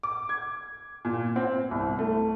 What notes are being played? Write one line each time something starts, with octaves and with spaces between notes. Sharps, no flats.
D6
G#6
A#2
C4
C2
A3